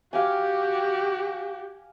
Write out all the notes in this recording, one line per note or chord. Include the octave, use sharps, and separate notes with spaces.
F#4 G4 F5 G#5